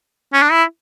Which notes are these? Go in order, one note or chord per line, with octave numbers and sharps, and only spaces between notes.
C#4
D4
E4